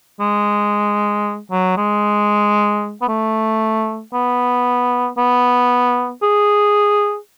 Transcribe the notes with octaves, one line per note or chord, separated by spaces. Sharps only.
G#3
F#3
G#3
B3
A3
B3
B3
G#4